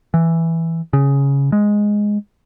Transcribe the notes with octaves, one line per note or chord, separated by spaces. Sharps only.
E3
C#3
G#3